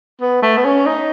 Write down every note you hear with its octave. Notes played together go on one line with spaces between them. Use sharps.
B3
A3
B3
C#4
D#4